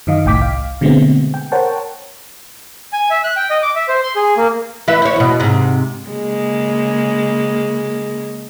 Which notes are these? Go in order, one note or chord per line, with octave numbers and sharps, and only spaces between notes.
F#2 D#3 D#5 F5
G1 C2 A2 G5 D6 B6
F5
B2 D3 G#3 A3 B3 C4
G5
A#4 C5 C#5 F#5 G5 A5
G#5
E5
F#6
G5
D#5
D6
E5
C5
C6
G#4
A#3
E3 B4 E5
C5 C#5
E2 B2
G#2 C3
C#3 G#3 A#3